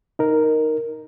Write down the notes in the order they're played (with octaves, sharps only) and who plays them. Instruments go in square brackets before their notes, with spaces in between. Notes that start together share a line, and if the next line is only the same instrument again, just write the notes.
[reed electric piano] D#4 A#4